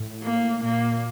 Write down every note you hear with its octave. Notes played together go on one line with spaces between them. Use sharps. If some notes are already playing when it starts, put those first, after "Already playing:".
Already playing: A2
A#3
A#2 A#3